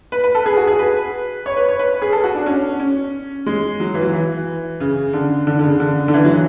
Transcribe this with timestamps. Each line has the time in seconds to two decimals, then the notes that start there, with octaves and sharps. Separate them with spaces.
0.12 B4
0.24 B4
0.35 A4
0.46 G#4
0.57 F#4
0.67 G#4
0.79 B4
1.46 C#5
1.57 B4
1.69 C#5
1.79 B4
2.02 G#4
2.12 A4
2.24 F#4
2.35 D4
2.46 C#4
2.80 C#4
3.46 G#3
3.80 F#3
3.94 E3
4.01 F#3
4.13 E3
4.80 C#3
5.13 D3
5.47 D3
5.59 D3
5.63 C#3
5.80 D3
6.08 D3
6.14 E3
6.25 F#3